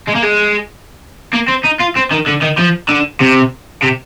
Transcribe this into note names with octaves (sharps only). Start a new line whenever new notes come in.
G#3
A#3
G#3
A#3
C4
D#4
F4
C4
D#3
D3
D#3
F3
D3
C3
C3